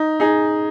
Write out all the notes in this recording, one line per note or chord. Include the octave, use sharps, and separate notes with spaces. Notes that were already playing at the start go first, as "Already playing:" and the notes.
Already playing: D#4
D#4 G#4